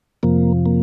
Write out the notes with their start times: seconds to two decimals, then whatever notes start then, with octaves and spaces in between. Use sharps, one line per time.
0.23 F2 C3 F3 A#3
0.66 A#3